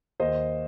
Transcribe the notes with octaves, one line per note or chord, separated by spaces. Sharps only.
D#2 C5 D#5